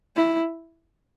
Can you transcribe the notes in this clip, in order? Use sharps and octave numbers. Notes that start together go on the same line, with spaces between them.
E4